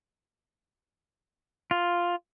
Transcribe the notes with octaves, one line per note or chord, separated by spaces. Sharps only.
F4